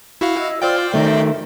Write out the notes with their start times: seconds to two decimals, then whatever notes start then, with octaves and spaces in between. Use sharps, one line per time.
0.21 E4 F#4 F5
0.40 D#5 E6
0.62 F4 C5 D5 G5 E6
0.94 D#3 A3 D#5 E5